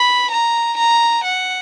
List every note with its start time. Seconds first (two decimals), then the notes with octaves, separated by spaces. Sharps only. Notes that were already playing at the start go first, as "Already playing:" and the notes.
Already playing: B5
0.31 A#5
0.78 A#5
1.24 F#5